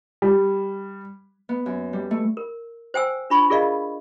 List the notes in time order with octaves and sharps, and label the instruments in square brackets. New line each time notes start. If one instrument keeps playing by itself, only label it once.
[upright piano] G3
[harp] B3
F#2
G3
A3
[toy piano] A#4
C5 G5 G#5 E6
D4 F4 B5 C#6
F4 G#4 A#4 D5 D#5 F5